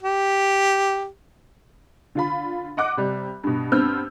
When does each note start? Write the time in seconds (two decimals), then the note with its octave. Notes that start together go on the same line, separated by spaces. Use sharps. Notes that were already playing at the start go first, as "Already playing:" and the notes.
0.03 G4
2.15 D3 F4 B5
2.77 D#5 F#5 D6 F#6
2.97 C3 G3
3.44 G2 B2
3.72 G2 B3 C4 E6 F6 G6